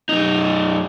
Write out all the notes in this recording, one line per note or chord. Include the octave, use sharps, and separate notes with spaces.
F#2 D#4